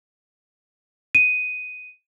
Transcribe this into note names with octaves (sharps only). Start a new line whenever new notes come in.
D#7